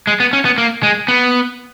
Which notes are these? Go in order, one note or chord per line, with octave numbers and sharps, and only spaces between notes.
G#3
B3
C#4
B3
A#3
G#3
B3